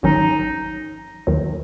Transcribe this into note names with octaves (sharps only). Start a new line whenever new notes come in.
G#1 G#2 D#3 F#3 C#4 D#4
D#2 D#3 F#3